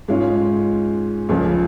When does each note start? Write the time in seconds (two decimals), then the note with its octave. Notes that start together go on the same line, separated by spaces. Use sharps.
0.08 G#2 G#3 C#4 F4
1.29 C#2 C#3 F3